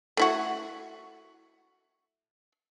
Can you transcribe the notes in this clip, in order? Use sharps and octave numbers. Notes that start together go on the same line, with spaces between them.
A3 E4 F#4